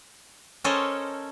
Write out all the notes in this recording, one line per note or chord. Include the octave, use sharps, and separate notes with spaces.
C#4 A4 A#4 C5 C#5 D#5